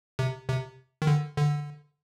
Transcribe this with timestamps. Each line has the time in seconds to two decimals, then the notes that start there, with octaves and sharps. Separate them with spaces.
0.19 C3
0.49 C3
1.02 D#3
1.07 D3
1.37 D3